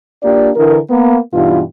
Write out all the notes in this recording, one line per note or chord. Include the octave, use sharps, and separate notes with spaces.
A#3 D4 F4 G4 D5
D3 E3 A#4
A#3 B3
G2 B2 E3 G3 D#4 F4